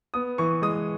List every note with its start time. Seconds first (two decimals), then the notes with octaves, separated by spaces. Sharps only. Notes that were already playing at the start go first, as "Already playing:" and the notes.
0.14 B3 D#6
0.38 E3 C#6
0.62 G#3 D#6